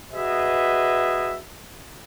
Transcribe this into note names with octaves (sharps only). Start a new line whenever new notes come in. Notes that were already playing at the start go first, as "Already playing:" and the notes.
F#4 G#4 B4 D#5 E5